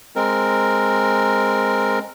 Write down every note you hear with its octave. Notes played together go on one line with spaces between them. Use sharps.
G#3 C4 A#4